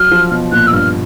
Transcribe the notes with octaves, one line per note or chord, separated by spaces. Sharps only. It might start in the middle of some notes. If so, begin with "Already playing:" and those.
Already playing: F#3 F6
F3
B2
A#2 F#6
E6
G2 F6